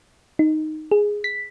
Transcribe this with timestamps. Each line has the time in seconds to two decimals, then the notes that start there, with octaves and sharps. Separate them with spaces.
0.39 D#4
0.91 G#4
1.24 B6